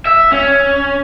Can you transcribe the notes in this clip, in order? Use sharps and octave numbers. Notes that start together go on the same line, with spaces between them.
E5
C#4